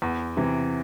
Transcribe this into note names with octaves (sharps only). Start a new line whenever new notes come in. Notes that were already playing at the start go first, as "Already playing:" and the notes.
E2
C3 E3